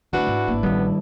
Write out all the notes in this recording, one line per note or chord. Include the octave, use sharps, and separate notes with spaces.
D3 A3 D4 E4 F#4 B4
G#2
G#1 A#3
A1 D#3 F3 G3 B3